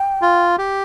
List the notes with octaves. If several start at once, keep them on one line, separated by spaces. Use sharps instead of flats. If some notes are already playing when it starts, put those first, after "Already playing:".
Already playing: G5
F4
G4